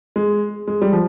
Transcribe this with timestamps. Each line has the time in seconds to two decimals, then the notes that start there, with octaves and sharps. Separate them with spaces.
0.16 G#3
0.68 G#3
0.82 G3
0.93 F3